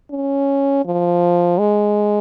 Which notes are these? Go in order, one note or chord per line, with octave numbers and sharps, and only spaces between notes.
C#4
F3
G#3